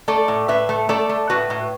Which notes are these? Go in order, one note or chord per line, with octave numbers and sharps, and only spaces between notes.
A3 A4 D5
A2
A2 B4 E5
A3
A3 A4 D5
A3
A2 F#4 B4
A2